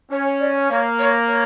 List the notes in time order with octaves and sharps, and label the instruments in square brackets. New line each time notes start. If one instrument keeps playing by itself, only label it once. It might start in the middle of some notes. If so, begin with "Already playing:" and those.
[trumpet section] C#4 [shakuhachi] C#5
[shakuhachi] D5
[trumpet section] A#3 [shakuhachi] C#5
[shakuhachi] C#5
C#5